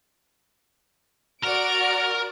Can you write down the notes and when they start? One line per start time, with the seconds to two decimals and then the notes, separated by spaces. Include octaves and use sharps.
1.43 F#4 A#4 D5 D7